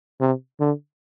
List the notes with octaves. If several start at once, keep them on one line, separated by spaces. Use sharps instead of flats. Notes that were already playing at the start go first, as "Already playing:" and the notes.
C3
D3